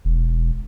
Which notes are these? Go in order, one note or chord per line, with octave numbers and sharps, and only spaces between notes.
E1